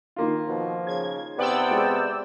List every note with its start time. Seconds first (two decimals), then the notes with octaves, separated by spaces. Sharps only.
0.16 D#3 A#3 F4
0.48 B2 F3
0.87 C#3 G#6
1.39 C3 B3 D5 G5 E6
1.71 G#3